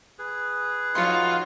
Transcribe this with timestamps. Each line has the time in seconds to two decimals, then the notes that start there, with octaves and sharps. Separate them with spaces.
0.19 G#4 B4
0.95 F3 D#4 F4 F#4 C#5 F5 C6